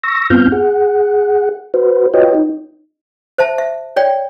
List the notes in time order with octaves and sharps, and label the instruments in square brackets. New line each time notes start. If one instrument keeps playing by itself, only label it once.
[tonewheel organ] C#6 E6 A#6
G2 B3 C4 F4 F6 G6
G#4 F#5
F#4 B4 C5
F4 F#4 B4 C#5 D#5 G5
D#4
[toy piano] C5 E5 A5
E5
C#5 D5 G5